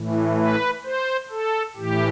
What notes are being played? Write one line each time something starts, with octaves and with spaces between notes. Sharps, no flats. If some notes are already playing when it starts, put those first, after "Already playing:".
Already playing: A2 E3
B4
C5
A4
A2 E3 G4